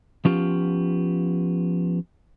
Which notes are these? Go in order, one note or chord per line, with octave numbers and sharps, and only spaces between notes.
F3 B3 C#4 F4 G4